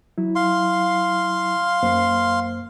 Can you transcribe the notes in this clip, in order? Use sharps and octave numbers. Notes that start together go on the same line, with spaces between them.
F#3 E4
F5 C6
F#2 A#3 C5